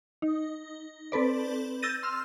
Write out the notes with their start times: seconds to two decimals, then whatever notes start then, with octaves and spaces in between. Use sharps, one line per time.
0.22 D#4
1.12 C4 A4 B4 D5
1.82 E6 G6 A6 A#6 D#7
2.03 C6 E6 F6